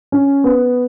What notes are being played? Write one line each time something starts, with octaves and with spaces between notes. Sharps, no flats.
C#4
B3